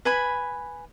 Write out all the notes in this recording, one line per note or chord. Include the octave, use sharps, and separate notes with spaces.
B4 G#5 B5